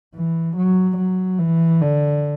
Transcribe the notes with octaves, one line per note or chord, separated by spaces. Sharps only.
E3
F#3
F#3
E3
D3